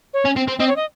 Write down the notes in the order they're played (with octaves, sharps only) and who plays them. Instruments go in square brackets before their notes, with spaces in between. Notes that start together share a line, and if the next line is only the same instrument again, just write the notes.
[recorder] C#5
[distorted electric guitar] C#4
C4
C4
[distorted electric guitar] C4 [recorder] D#5
[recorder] C#5
D#5